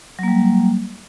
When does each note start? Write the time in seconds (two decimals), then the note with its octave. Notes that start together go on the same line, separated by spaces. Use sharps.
0.19 F#3
0.23 A#3
0.28 G3